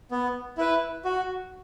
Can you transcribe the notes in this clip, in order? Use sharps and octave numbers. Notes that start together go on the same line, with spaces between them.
B3
E4 B4
F#4